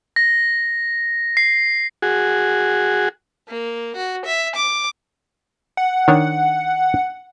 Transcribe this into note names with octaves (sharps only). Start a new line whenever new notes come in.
A#6
C7
F#4 G#4
A#3
F#4
E5
D6
F#5
D#3 D4 C#5